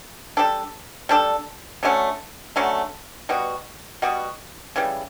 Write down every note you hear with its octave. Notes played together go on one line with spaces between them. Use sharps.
G3 D4 A4
G3 D4 A4
D3 F#3 A3 C#4
D3 F#3 A3 C#4
B2 G3 B3 F#4
B2 G3 B3 F#4
C#3 E3 G3